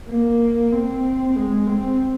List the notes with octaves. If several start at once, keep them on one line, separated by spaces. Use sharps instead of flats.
A#3
C4
G#3
C4